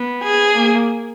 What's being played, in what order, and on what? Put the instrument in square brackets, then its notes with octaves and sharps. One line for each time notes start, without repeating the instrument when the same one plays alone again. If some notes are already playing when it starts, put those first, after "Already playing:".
Already playing: [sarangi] B3
[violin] G#4
[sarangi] A#3